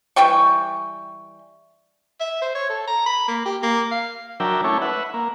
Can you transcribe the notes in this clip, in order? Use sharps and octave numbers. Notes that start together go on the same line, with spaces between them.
E3 G3 G5 C#6
E5
C5
C#5
A4
A#5
B5
A#3
G4
A#3
F5
F#3 D4 A#4 E5 G5
A3 C#4 D4 E4 C#5
B4 E5 F#5
A#3